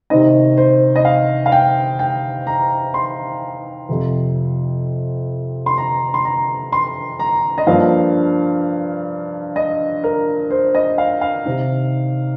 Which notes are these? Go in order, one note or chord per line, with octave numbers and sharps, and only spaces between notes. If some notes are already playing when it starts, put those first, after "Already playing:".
C3 D#3 C4 D#4 D#5
C5
D#5
F5
F5
G5
G5
A#5
C6
F2 C3 F3
C6
A#5
C6
A#5
C6
A#5
D#5
G2 F3 A#3 F5
D#5
A#4
C5
D#5
F5
F5
C3 D#3 C4 D#4